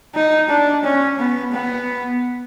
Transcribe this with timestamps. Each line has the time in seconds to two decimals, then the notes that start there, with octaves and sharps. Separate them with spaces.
0.15 D#4
0.49 D4
0.83 C#4
1.19 B3
1.53 B3